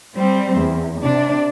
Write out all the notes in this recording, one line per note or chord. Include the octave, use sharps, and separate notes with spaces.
G3 C4
E2
C3 D4